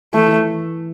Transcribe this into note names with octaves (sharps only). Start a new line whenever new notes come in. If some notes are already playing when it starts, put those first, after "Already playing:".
E3 A3
E3